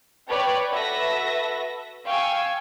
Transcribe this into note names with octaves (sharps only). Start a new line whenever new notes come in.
B4 C#5 D5 G5
F#4 A4 B4 E5 A#6
F5 G5 G#5 C#6 E6